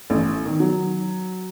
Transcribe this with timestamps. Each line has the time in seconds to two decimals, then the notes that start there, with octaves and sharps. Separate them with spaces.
0.10 A1
0.45 D#3
0.60 F#3